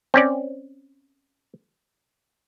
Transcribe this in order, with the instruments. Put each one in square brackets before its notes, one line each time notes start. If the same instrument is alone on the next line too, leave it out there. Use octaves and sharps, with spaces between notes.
[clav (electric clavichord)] C4 C#4 D5